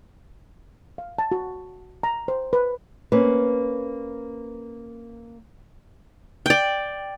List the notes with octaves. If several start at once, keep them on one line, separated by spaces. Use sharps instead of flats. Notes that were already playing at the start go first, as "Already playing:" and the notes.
F5
A5
F#4
A#5
C5
B4
A#3 C4 C#4 B4
D5 G5